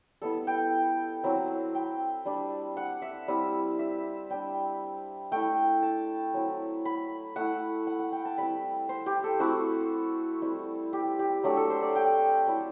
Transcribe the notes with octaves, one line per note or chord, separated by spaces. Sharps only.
G3 B3 E4 A4
G5
F#3 C4 E4
G5
G3 D4
F#5
E5
G3 C4 E4
E5
G3 D4 G5
A3 E4 G5
A5
F#3 C4 E4
B5
A3 E4 F#5
F#5
F#5
G5
A5
G3 C4 E4 B5
C5
G4
A4
A3 C4 E4 F#4
G3 C4 E4
G4
G4
F#3 A3 D4 G4
A4
C5
D5
G5
F#3 A3 E4